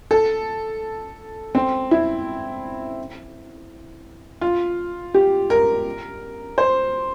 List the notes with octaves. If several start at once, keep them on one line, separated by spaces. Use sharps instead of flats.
A4
C4
E4
F4
G4
A#4
C5